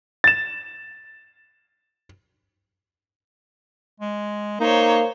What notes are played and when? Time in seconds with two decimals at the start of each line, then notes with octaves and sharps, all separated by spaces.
0.24 A6 E7
4.00 G#3
4.60 A#3 D#4 C5 C#5